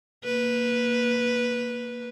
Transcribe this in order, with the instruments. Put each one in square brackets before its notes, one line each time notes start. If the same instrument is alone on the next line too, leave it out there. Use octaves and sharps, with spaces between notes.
[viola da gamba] A#3 B4